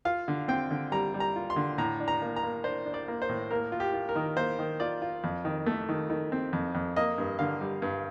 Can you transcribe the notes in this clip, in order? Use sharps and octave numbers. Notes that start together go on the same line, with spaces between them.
F4 F5
D3
C4 G5
D3
G3 A#5
G3
A#5
F4
C6
D3
A2 A#5
D4
A#5
A#3
A#5
A#3
D4 C5
D4
D5
A#3
C5
A2
A#3 A#4
F4
G4
F4
A#4
D#3
A#3 C5
D#3
F4 D5
F4
F2
D#3
A3
D#3
D#3
C4
F2
F2
A#3 D#5
G2
D3 F5
G3
G2